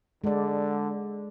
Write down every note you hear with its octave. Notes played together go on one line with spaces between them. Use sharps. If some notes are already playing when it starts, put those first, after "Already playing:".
D3 G#3 D5